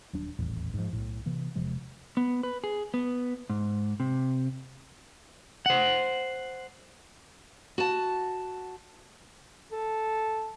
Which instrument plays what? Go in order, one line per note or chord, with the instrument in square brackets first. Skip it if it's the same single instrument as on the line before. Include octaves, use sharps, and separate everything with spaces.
[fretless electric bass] D#1 F#3 D4
D#1 A1 E2 A2
G#2 F3
B1 A2
C3 E3 A#3
E1 C3 F3 G#3
[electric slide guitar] B3
B4
G#4
B3
G#2
C3
[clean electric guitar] C5 F#5
[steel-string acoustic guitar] F#4 A5
[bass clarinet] A4